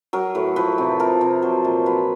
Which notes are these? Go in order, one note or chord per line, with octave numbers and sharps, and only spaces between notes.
F#3 A#4
A2 B4
F3 B4
C3
F3 A#4
C3
F#3 C5
A#2
F#3 B4